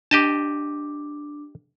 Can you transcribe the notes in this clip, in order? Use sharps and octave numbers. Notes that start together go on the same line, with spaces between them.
D4 G4 D#5 A5 D6